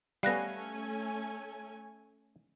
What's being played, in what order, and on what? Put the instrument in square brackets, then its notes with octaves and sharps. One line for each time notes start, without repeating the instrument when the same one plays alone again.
[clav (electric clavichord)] G3 B3 [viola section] A3 C#4 G#5 [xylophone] F5 F#6 A#6